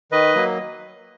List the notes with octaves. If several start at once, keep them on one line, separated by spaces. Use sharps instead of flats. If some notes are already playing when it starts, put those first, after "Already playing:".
D#3 B4 D#5
F#3 A#3